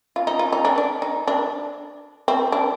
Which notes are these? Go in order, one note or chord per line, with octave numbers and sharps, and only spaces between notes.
F4
D#4
F4
D#4
D4
D4
D#4
D4
C4
D4